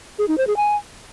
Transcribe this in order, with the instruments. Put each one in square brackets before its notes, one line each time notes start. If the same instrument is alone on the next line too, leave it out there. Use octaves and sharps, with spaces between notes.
[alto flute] G#4
D#4
C5
G#4
G#5